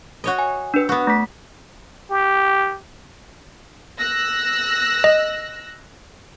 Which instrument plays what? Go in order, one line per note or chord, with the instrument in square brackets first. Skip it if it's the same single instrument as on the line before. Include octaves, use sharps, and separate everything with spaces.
[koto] F#4 C#5 D#5
[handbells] G#5
D4 B4
[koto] B3 F#4
[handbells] A3 B6
[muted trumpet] G4
[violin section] E6 F#6 A#6
[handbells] D#5